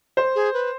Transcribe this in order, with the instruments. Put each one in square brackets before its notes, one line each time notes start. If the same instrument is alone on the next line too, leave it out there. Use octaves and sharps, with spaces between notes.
[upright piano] C5
[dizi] G#4
B4